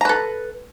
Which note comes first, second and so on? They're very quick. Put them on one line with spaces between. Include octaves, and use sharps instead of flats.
A#5 B4 A4